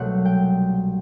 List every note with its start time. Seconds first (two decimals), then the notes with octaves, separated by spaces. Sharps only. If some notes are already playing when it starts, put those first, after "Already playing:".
Already playing: C2 B2 F#3 A3 F#5
0.25 G5